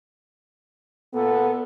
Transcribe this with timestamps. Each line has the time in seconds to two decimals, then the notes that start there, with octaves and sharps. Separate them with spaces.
1.14 A#2 B3 A4